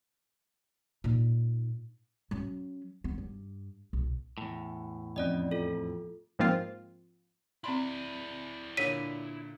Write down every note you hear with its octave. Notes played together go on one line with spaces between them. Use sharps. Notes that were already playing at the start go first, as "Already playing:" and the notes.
A#2 D#4
F#3 C#4
B3
G2
B1
E2 A2
F2 C#4 D5 D#5
F4 A4
G#2 F3 A#3 C4 F4
C4 E4 D5 B5 C6
A#2 D3 C#5 B6 D#7